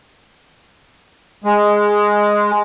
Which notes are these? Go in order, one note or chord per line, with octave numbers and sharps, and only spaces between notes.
G#3